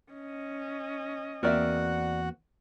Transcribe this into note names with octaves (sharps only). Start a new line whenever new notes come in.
C#4 D#5
E2 A#3 C4 F#4 A#4 D5 E5 F#5